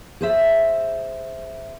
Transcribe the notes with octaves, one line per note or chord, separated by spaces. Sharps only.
G#4 C5 E5